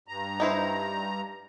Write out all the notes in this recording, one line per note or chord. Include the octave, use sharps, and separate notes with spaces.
G2 A#5
D#4 E4 C5